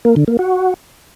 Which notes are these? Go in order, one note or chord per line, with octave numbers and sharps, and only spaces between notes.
A#3
D3
A#3
F#4